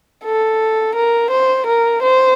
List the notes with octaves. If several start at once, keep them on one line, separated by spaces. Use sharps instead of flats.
A4
A#4
C5
A#4
C5